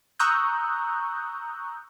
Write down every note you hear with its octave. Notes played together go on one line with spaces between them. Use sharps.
A#5 C#6 D#6 E6 F#6 G6